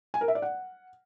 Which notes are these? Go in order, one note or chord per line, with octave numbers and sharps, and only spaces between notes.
G#5
A#4
E5
D5
F#5